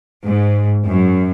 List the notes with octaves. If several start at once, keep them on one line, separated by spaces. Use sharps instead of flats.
G#2
F#2